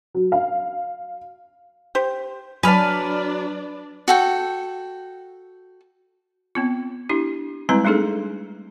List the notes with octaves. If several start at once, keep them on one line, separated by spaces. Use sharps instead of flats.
F#3
F5
G4 C5
F#3 D4 B4 D5 G#5 A5 F6
F#4 A4 G5
B3 C4 F4
D4 E4 G4
G3 G#3 C4 E4 B4 A#5
A3 D4 D#4 G#4 A4